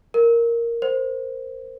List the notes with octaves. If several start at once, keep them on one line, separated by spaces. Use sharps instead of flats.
A#4
C5